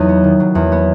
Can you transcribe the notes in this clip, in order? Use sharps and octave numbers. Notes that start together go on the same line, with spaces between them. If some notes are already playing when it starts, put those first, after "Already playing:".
Already playing: E2 F#3 D#4
B3
D#3
F#3
E2
B3